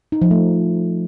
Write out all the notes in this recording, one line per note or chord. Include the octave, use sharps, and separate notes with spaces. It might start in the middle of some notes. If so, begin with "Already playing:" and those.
D#4
F3
A3